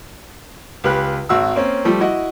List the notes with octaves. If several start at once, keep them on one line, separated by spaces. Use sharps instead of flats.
C#2 G4 B4 F6 F#6
G#1 F#4 E6
A#3 C4 C#4
F3 G3 A3
E4 F#4 D#5